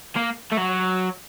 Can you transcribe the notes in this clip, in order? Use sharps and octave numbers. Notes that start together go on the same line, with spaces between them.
A#3
A3
F#3